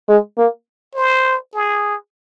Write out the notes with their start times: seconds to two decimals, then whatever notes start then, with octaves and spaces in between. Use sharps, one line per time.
0.08 G#3
0.38 A#3
0.95 C5
1.54 G#4